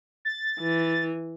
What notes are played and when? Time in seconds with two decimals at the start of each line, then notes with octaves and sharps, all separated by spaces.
0.25 A6
0.60 E3